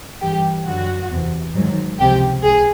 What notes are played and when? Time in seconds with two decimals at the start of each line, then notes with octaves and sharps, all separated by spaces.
0.21 G2 E3 G4
0.66 F#2 D3 F#3 F#4
1.10 E2 C3 E3
1.54 G#2 D#3 F#3
1.99 C#2 C3 F3 G4
2.43 C#2 G#4